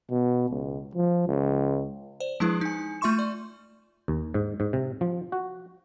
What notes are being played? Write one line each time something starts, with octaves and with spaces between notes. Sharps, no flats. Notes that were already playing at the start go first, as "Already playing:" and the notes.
B2
C#2
F3
C#2
C5 D5
F3 G#3 D4 E4 G#4 B4
D#4 G#5
A3 F4 E5 C6 C#6 E7
D5
D#2
G#2
G#2
C3
F3
F#4